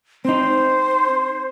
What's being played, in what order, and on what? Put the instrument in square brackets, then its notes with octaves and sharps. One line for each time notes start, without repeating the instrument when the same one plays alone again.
[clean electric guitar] C4 D#4 [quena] C5